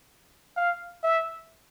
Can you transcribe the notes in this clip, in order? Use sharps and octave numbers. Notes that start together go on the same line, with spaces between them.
F5
E5